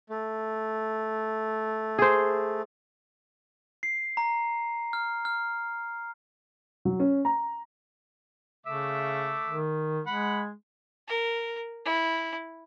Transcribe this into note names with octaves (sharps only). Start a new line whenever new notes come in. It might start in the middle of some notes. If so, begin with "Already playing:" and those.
A3
G#4 C5
C7
A#5
F6
F6
F#3
C#4
A#5
C#3 A3 E5 D6
D#3
G#3 F#5 B5
A#4
E4